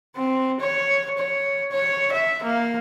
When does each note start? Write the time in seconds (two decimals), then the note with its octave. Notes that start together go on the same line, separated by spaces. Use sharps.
0.16 C4
0.60 C#5
1.18 C#5
1.71 C#5
2.11 E5
2.43 A#3